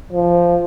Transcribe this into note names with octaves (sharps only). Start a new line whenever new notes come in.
F3